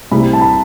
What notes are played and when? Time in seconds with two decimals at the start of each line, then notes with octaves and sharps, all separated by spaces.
0.11 C2 C3 G3 C4 B5
0.33 A5
0.41 B5